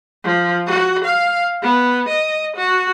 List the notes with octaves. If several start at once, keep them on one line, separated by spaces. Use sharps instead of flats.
F3
F#4
F5
B3
D#5
F#4